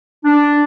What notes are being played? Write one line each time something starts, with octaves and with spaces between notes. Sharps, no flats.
D4